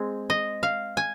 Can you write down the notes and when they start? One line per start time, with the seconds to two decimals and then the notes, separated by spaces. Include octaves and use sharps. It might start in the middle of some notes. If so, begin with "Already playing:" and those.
Already playing: G#3 C4
0.30 D#5
0.63 F5
0.97 G#5